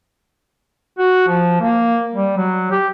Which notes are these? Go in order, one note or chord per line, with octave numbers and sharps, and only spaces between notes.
F#4
F3
A#3
G3
F#3
G4